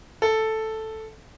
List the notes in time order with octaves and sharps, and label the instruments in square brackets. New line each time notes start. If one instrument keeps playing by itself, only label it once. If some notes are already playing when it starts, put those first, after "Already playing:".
[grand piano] A4